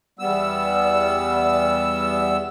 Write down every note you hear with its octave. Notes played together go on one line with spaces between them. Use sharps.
E2 G3 B3 E6